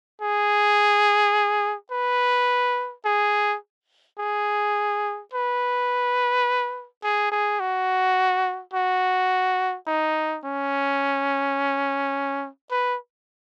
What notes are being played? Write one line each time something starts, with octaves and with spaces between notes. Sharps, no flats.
G#4
B4
G#4
G#4
B4
G#4
G#4
F#4
F#4
D#4
C#4
B4